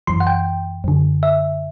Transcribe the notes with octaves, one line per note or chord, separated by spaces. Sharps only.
F#2 E3 C6
F#5
G5
F#2 D3
E5